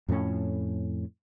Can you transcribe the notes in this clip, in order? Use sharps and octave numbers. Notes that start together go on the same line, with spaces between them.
F2 A2 B3 C#4